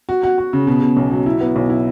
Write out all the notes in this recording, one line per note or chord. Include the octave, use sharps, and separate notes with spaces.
F#4
F#4
F#4
C#3
B2
B2
B1
F#3
E4
B3
B1
E4